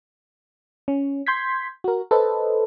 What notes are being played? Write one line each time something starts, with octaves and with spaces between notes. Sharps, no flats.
C#4
C6 G6 G#6 B6
F#4 A#4
A4 B4 C5 D#5